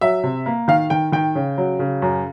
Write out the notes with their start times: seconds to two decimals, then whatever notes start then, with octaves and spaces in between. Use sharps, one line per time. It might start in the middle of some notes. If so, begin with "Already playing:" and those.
0.01 F#3 E5
0.24 C3
0.46 A#3
0.68 D#3 F5
0.90 D#3 G5
1.12 D#3 G5
1.35 C#3
1.58 F#3
1.79 C#3
2.02 F#2